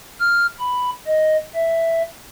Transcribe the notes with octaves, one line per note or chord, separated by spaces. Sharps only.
F6
B5
D#5
E5